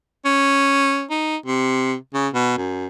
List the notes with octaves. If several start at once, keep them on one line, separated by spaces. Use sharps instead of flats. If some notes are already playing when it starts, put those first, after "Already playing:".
C#4
D#4
C3
C#3
B2
F#2